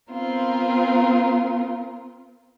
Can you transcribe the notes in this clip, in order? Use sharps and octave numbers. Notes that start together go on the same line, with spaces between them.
B3 C4 F4 A#4